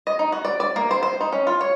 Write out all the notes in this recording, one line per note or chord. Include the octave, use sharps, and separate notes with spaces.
D#5
D#4
F#4
D5
D5
A#3
C5
C5
D#4
C#4
F4
C#5